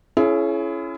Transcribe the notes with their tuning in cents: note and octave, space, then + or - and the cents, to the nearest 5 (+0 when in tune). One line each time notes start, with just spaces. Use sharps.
C#4 +0 E4 +35 G#4 +40